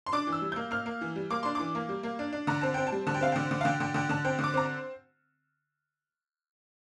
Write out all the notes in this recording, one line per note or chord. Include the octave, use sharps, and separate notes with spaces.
C6
D4 D6
E3
E6
G3
A#3 G6
A#3 F6
A#3
E3
G3
A#3 D6
D4 C6
E3 D6
A#3
G3
A#3
D4
D4
D3 A#5
C4 A5
C4 G5
A5
G3
D3 A5
G5
C4 F5
D3 G5
D3
F5
D3 G5
D3 G5
D3 G5
D3 A5
C4 G5
D3 D6
C4 A#5